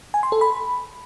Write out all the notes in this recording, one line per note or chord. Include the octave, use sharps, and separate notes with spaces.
G#5
C6
A4
B5